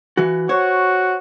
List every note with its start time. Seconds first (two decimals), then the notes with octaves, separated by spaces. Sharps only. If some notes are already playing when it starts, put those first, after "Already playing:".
0.17 E3 F#4
0.49 F#4 C5 C#5